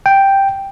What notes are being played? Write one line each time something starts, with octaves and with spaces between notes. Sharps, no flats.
G5